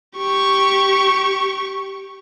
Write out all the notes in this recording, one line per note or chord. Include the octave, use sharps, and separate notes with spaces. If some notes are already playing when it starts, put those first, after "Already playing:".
G4 C#6